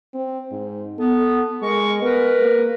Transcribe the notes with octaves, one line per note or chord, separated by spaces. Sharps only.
C4
G#2
B3 A4
G#3 A#4 C#6
B3 A#4 B4
A#3